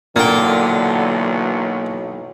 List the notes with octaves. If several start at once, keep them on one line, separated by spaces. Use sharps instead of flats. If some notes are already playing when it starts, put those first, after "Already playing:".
B1 A#2 D3 E3 F#3 A#3 G5